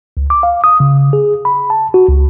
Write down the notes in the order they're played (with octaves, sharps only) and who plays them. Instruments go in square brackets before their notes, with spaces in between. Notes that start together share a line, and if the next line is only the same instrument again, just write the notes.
[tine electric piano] C#2
D6
F5
D#6
C#3
G#4
B5
A5
F#4
C#2